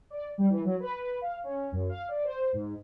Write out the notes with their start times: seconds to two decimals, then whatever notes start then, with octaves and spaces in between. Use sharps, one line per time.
0.10 D5
0.38 G3
0.50 E3
0.65 F#3
0.80 B4
1.21 F5
1.44 C#4
1.72 F#2
1.89 F5
2.09 D5
2.24 C5
2.53 G#2